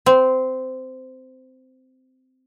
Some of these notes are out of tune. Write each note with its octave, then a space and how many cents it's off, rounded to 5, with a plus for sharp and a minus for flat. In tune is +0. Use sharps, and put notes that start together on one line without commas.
C4 -15